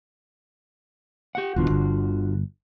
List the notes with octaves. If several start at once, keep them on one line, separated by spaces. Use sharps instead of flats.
G4 F#5
D#1 B2 D3 E3 F4 F#4
G1